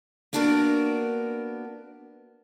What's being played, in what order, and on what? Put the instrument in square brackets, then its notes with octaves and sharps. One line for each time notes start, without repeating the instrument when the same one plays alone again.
[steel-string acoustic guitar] A#3 B3 D4 F#4 A#4 D5